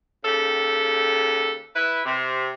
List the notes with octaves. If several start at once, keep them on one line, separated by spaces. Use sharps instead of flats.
D#2 C#3 G4 A4
E4 B4
C3